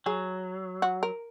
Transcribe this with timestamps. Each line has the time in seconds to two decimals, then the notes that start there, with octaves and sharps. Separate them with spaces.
0.06 F#3 G#4
0.82 F#4
1.03 A#4